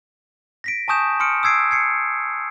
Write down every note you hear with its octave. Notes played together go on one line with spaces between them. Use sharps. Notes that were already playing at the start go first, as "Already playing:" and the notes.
A#6 B6 D7
G#5 A5 C#6 D#6 G6 E7
C6 D#6 F6 C#7 D7
D#6 E6 G#6 C7 D7
G#6 C7 C#7